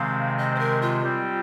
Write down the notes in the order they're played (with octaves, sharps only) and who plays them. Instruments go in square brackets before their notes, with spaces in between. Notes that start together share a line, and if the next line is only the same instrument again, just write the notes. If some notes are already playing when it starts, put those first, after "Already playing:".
Already playing: [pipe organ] C3 D#3 G#3 C4 [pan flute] F5
[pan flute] D#5
C5
A#4
F4
[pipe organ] G3 C4 G4